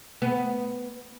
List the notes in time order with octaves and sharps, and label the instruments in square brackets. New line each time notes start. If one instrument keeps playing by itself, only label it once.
[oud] B3